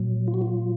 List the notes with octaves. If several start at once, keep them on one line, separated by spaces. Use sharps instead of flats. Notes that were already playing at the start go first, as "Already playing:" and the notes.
Already playing: A#2 F#3
F4
F#4
F4